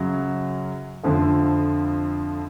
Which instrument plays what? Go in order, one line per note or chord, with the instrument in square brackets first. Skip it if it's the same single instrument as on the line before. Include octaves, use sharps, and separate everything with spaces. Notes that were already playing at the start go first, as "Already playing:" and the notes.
Already playing: [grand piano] F#2 C#3 F#3
F2 D3 F3 A3